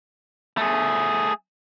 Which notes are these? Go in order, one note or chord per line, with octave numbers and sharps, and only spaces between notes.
A3 G#4